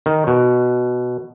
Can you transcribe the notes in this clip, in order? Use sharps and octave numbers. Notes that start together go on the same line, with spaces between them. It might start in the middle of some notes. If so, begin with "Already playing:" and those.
D#3
B2